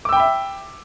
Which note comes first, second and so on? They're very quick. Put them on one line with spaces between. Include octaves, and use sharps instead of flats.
D6 E6 G5 B5 E5